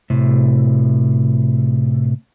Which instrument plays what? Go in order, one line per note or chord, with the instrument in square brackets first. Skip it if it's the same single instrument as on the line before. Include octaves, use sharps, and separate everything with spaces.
[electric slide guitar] A2 C3